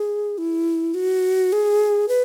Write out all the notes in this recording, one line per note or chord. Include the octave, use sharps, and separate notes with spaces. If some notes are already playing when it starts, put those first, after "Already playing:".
Already playing: G#4
E4
F#4
G#4
B4